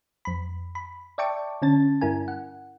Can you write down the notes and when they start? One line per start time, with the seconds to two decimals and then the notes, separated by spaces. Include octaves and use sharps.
0.25 F2 B5
0.75 B5
1.18 D5 E5 G5 A5 C#6 D6
1.62 D3 C#4 A5 A6
2.01 G2 E4 A#4 G#5
2.28 F#5